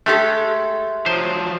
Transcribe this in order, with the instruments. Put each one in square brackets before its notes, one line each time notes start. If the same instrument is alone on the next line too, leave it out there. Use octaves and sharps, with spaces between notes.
[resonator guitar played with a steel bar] G#3 G4 A4 [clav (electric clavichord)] A3 [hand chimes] E5
[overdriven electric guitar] F3 F#3 [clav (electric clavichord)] C5